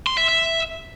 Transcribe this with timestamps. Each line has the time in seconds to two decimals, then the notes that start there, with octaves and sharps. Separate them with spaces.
0.07 C6
0.18 E5
0.29 E5